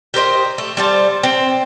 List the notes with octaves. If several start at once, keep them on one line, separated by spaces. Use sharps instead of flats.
G4 A#4 C5 D#5
A3
G3 C5 A5
C4